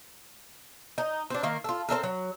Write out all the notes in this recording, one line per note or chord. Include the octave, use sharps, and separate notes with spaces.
D#4
C4 D4
D#3 A#3 A#4
F4 A4
C4 D#4 A4 A#4
F#3